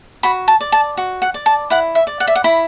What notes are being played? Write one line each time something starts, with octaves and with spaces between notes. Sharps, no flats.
F#4 B5
A5
D5
A5
F#4
F#5
D5
A5
E4 F#5
E5
D5
F#5
E5
F#5
E4 B5